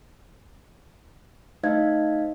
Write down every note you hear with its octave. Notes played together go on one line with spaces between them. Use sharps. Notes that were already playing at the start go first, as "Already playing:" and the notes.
A3 D#4 C5 D#5 F5 G#6